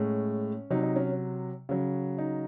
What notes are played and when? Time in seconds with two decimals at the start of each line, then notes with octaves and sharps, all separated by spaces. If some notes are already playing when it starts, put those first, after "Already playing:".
Already playing: A2 G#3 C#4
0.70 C3 F#3 D#4
0.83 D#4
0.96 C#4
1.69 C#3 F#3
2.18 D#4